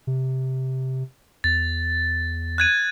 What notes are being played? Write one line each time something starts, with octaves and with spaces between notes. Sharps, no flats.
C3
E2 A6
F#6 G#6 D#7